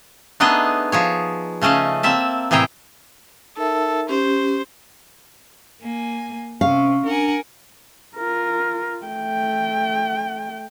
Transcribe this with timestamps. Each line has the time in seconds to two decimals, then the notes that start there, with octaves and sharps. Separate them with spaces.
0.40 A3 B3 D4 D#4 G#4 D#5
0.92 F3 G#4 C#5
1.61 C#3 A3 C#4 D#5 F5
2.03 A#3 C4 E5 A5
2.51 A2 C3 E3 G#4 G5 A#5
3.57 D#4 A4 A#4 E5
4.09 C#4 G4 C5
5.81 A#3 G#5
6.61 C3 C#4 F5 C#6
7.06 D4 A#4 F#5 G#5
8.17 F4 A#4
9.04 A3 G5